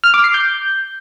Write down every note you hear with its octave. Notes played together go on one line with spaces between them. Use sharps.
F6
D6
C7
G6